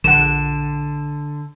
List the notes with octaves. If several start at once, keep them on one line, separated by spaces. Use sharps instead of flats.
A#1 D3 F#5 E7